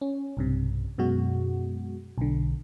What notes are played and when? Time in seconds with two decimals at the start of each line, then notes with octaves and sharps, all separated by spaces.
0.01 C#4
0.37 B1 G2 C3
0.98 F#2 B2 G#3 F#4
2.18 B1 D3